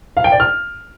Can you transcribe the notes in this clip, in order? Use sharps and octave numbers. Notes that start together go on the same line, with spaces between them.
F5
G5
D5
F6